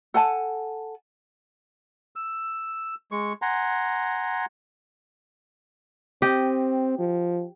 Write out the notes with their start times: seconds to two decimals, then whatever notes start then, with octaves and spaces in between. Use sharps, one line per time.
0.14 A4 F#5 G#5 A5
2.16 E6
3.11 G#3 C#6
3.42 F#5 G#5 A#5 C6
6.22 C4 G4 D#5
6.99 F3